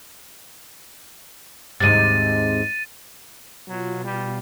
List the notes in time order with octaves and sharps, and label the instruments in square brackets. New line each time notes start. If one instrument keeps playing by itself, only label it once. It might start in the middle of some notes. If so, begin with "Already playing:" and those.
[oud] D#2 G#2 C3 [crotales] A6 D#7
[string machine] B2 F4 [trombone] F#3
[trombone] G3